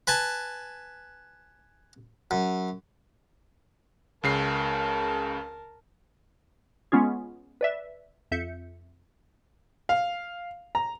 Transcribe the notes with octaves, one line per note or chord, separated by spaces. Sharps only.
B4 G#5 A5
F#2
C#2 C#3 A#4 A5 C7
G#3 B3 C#4 F4 G#4
B4 D5 E5
F2 E5 G6 C#7
F5
A#5